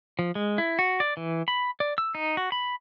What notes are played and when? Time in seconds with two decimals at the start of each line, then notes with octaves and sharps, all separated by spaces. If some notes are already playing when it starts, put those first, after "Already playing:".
0.19 F3
0.35 G#3
0.58 E4
0.79 F#4
1.00 D5
1.17 E3
1.48 B5
1.80 D5
1.98 E6
2.15 D#4
2.37 F#4
2.52 B5